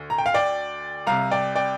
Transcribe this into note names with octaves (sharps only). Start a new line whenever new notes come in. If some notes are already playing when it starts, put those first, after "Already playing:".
Already playing: D2
A#5
G5
F5
D5 G5
C2 C3 F5 A#5
D5 G5
D5 G5